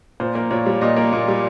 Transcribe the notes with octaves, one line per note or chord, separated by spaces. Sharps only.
A#2 C5
A#3
A#2 C#5
G3
A#2 D#5
A#3
A#2
G3